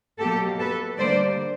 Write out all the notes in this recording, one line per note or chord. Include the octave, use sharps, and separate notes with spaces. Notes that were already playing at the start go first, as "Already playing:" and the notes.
B2 F#3 A#3 G4 A4
A4 B4
D3 G3 A#3 C5 D5